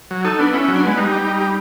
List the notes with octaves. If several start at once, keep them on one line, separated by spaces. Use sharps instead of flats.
F#3
D#4 A4
B3 D4
C#4 E4
C#4
F#3
D4
G#3 B3
G3 D#4
G4
D#4
G4